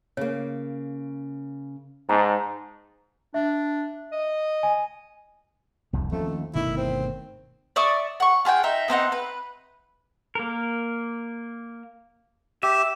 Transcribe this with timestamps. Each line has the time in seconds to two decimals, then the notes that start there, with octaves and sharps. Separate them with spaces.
0.17 C#3 A#3 C#5
2.09 G#2 A5 A#5
3.34 D4 E5
4.12 D#5
4.63 G#5
5.93 D1 C2 F2 G#2 C3
6.12 D#2 F3 A3 C4 C#4
6.55 G1 B2 D#3 A3 E4
6.77 C4
7.76 D5 E5 C#6 D#6
8.20 F#5 C#6
8.45 F4 G#4 F#5 G5
8.64 D#4 E5
8.88 B3 C4 D#4 F#5
9.12 B4
10.35 A#3 A#4
12.63 G4 E5